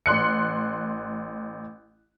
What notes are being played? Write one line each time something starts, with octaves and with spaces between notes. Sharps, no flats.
A1 C6 F#6 C#7